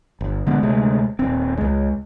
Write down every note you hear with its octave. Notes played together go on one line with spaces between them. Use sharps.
G1
D3 G#3 B3
D2 C3 G#3 A3
D#1 C4
C#2 G#3